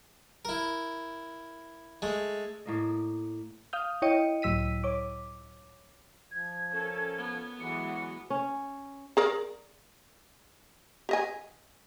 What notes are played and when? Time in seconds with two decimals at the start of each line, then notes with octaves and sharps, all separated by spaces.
0.45 E4 A#4
2.02 G#3 A3
2.66 A2 A#3 D#5
3.73 F5 D#6 F6 G6
4.02 E4 C#5 D#5 G5 C#7 D#7
4.42 C#2 A2 F#3 E6 B6 D#7
4.84 C#5 D6
6.31 F3 G#6
6.72 C#4 A4 A#4
7.18 B3
7.60 E3 F#3 G#3 F#4 C#7
8.30 C#4
9.17 G#4 A#4 D5
11.09 G4 D#5 G#5